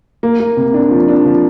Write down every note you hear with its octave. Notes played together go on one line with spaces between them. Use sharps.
A#3
A#3
C3
D4
F3
D4
F3